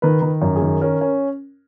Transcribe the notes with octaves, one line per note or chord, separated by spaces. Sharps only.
D#3 B4
D#3
F#2
G#4
D#3
C#4 A#4
C#4